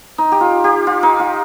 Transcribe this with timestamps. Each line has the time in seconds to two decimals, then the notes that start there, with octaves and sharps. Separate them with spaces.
0.18 D#4
0.32 G4
0.41 F4
0.64 G4
0.87 F4
1.03 D#4
1.20 F4